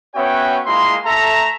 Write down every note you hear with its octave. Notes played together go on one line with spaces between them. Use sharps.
B3 C#4 F#4 C#5 E5 G5
G#3 A#3 E4 F4 C6
A3 A4 E5 A#5